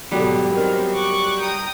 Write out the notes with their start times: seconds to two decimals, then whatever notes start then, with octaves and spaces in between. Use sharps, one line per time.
0.12 G#2 B2 D3 F#3 G3 B3
0.52 D#3 C4
0.93 C#6 D6 F#6
1.39 G5 A#5 D#6